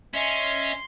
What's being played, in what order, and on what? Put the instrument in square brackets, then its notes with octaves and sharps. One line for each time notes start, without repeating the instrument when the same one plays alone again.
[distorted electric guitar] C#4 [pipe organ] D#5 E5 [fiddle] C6